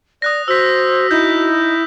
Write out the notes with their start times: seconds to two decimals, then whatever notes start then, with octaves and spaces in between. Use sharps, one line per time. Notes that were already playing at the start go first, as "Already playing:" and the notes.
0.22 D5 D#6 F#6 A#6
0.48 F#4 C5 E6 B6
1.11 D#4 E4 G6